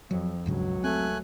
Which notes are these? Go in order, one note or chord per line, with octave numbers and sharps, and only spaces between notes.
F2 F#3
E1 C#2 G2 C#3 F#3
A3 C4 G#5 F#6